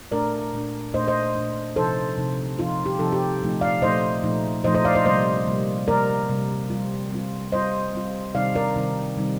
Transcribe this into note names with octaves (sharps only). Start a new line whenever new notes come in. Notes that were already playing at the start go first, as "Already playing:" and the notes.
A#2 A3 D4 A#4 D5
A#2 A3 D4
A#2 A3 D4 C5 D#5
C5 D#5
A#2 A3 D4
C3 F3 C4 D#4 A4 C5
C3 F3 C4 D#4
C3 F3 C4 D#4 F4
G4
C3 F3 C4 D#4 A4
G4
A#2 F3 A3 D#4
D5 F5
A#2 F3 A3 D#4 C5 D#5
A#2 F3 A3 D#4
A#2 F3 A3 D#4 C5 D#5
C5 D#5
D5 F5
C5 D#5
C3 G3 A#3 C5 D#5
C3 G3 A#3
C3 G3 A#3 A#4 D5
C3 G3 A#3
G3 C4 F4
G3 C4 F4
G3 C4 F4 C5 D#5
G3 C4 F4
C3 D#3 G3 C4 D#4 D5 F5
A#4 D5
C3 D#3 G3 C4 D#4
C3 D#3 G3 C4 D#4